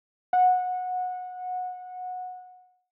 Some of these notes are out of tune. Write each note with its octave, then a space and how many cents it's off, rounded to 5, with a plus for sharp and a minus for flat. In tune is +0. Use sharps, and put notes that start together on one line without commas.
F#5 -20